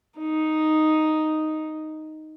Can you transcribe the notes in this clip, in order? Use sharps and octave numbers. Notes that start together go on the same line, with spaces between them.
D#4